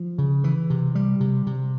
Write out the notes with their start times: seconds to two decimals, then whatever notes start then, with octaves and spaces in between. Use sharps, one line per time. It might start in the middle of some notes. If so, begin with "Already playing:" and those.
Already playing: F3
0.18 C#3
0.44 E3
0.70 C3
0.95 G3
1.20 C3
1.47 C3